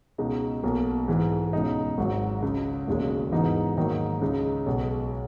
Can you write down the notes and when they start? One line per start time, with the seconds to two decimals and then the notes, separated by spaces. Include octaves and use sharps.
0.18 C#2 B2 G#3 D#4
0.63 B1 B2 A#3
1.08 G#2 E3 G#3
1.53 C#2 B2 G#3 D#4
1.98 G#1 G#2 F#3
2.42 C#2 C#3 G#3
2.87 E1 D#2 C#3 G#3
3.32 G#2 E3 B3 D#4
3.77 G#2 D#3 F#3 A#3 D#4
4.21 C#2 C#3 G#3 D#4
4.66 B1 B2 G#3 B3